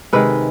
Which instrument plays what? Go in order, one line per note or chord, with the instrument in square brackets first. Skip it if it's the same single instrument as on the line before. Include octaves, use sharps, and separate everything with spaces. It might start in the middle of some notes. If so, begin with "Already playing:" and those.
[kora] C3 D#3 G#3 B4